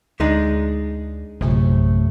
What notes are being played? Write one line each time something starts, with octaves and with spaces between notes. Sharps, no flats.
D2 G#3 D4 D#4
A#1 F#2 A2 C3 A3